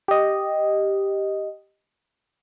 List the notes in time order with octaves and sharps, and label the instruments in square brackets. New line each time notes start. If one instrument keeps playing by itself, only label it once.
[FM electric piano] G4 D#5